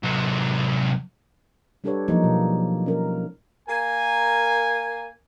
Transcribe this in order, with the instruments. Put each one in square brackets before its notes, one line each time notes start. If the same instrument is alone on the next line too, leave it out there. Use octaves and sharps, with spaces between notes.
[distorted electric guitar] C3 F#3
[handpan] G3 D4 G4 A4 B4 C#5
F3 F#3 A#3 D#4
B2
C#4 A#4
[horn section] A#3 A#4 G#5